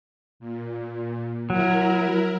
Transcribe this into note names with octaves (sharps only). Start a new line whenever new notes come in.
A#2
F#3 E4 A#4